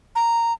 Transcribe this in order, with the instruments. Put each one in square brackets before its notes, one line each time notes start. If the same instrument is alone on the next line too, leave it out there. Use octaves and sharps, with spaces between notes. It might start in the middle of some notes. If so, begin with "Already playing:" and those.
[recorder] A#5